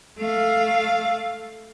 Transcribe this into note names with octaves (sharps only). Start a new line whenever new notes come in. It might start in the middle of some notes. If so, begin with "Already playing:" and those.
A3 F5